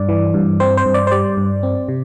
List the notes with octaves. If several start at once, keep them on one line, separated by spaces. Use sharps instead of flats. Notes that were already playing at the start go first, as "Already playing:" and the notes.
Already playing: G2 D5
E3
G2
C4 C5
C5
G2
D5
C5
G3 D5
G2
C4
C3